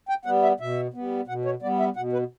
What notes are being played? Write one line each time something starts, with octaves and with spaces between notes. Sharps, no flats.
G5
G3 B3 F#5
E5
B2 E5
G3 B3
B2 F#5
C#5
G3 B3 D5
E5
B2 F#5
B4